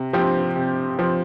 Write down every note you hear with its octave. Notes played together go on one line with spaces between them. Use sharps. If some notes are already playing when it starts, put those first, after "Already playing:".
Already playing: C3
F3 C4 G4
C3
F3 C4 G4